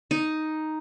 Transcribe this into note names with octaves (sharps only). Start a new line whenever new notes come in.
D#4